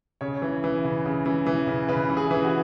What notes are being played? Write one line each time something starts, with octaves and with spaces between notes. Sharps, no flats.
C#3 C#5
E3
E3
C#3
C#3
E3
E3
C#3
C#3 B4
E3
G#4
E3
F#4